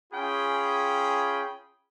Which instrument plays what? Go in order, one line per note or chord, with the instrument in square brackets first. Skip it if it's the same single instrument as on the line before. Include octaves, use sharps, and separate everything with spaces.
[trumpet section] C#4 F4 G#4 G5 B5